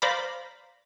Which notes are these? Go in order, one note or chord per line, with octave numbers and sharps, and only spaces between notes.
C5 D5 F5 A#5 B5